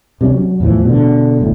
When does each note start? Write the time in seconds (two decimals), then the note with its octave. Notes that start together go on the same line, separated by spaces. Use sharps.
0.21 C3 G3 A#3 C#4
0.33 F#3
0.60 E2 A2 E3 F3
0.85 B2 D3
1.39 G1 D2 A2